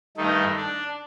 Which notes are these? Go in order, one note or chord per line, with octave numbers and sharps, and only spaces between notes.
G2 D#3 A3 D#4
D4